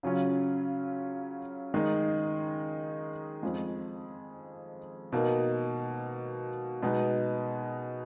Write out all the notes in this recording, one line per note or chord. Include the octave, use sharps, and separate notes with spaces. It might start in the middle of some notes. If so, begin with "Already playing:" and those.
C#3 F#3 C#4 F4
D#3 G#3 D#4
F2 F3 G#3
B2 A#3 D#4
B2 G#3 B3 D#4